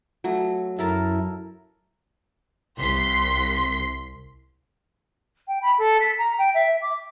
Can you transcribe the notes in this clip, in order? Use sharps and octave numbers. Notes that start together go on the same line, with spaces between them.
F#3 A3
F#2 E4 A4 A#4 A5
C2 C6 B6
G5
B5
A4
B6
A#5
G5
E5
D6